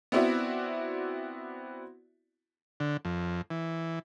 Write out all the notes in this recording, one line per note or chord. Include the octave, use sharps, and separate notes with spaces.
B3 C4 E4 F#4 D5 E5
D3
F2
E3